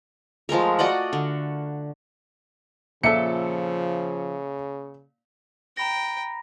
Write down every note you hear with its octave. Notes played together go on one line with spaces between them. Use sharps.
F3 G#3 A3 A#4
F#4 D5 D#5 F#5
D3
A#2 C#3 F3 A4 E5 C#7
G5 A#5 B5 A#6